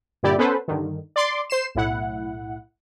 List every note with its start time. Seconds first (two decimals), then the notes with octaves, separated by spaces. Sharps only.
0.23 G2 A#2 D3 E4 G4 D5
0.38 B3 C#4 A4 B4 C5
0.68 G2 D3 D#3
1.16 D5 C6 D6
1.50 C5 C7 E7
1.75 B1 A2 E4 F#5